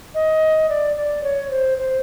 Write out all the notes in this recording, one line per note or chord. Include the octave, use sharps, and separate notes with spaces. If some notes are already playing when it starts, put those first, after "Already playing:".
D#5
D5
D5
C#5
C5
C5